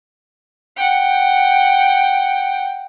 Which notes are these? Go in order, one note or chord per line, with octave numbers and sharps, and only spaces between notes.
F#5 G5